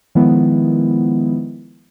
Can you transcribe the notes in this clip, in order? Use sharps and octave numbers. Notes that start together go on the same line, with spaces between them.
D#3 F3 G#3 B3 E4